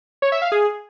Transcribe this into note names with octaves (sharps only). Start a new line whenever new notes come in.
C#5
E5
F5
G#4